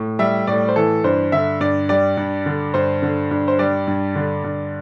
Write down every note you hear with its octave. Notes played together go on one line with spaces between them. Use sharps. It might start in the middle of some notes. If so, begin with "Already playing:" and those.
Already playing: A2
G3 E5
A2 D5
C5
E3 A4
G2 C5
D3 E5
G2 D5
G3 D5
G2
D3
G2 C5
D3
G2
C5
G3 D5
G2
D3
G2